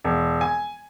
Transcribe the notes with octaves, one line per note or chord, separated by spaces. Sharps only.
E1
G#5